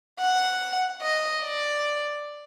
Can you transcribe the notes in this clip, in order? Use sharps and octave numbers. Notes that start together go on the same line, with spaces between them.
F#5
D#5
D5